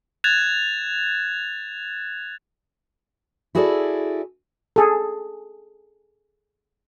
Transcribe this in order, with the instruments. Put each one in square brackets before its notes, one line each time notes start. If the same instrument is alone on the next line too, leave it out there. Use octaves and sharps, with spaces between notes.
[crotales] F#6 G#6 A6 E7 F7
[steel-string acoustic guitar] E4 F#4 G#4 A4 B4 D5
[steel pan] G#4 A4